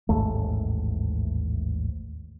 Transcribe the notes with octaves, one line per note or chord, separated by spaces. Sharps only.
A1 D#2 G#2 A3